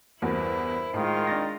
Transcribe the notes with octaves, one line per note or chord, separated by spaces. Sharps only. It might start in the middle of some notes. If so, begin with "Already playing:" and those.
E2 G2 E4 F#4 A#4 C5
A2 D#3 G#3 F4
D4 A6 A#6